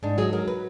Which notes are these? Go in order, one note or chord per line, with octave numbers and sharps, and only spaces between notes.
G#2 D4
F#3 G#4
F#3 A#4
B4